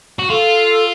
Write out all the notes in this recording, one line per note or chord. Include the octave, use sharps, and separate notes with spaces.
F#4
F4 A4